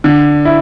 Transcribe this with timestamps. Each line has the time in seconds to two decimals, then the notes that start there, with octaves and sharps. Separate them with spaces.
0.04 D3
0.45 E4